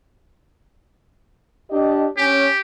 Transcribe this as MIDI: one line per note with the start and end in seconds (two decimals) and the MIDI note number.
1.71 2.06 62
1.71 2.06 67
1.71 2.06 75
2.17 2.46 61
2.17 2.60 67